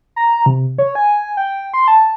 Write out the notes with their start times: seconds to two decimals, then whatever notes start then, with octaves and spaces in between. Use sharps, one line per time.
0.16 A#5
0.46 C3
0.78 C#5
0.95 G#5
1.37 G5
1.74 C6
1.88 A5